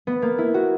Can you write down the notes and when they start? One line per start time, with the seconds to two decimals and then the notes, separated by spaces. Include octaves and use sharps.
0.07 B3
0.22 A#3
0.38 E4
0.54 F#4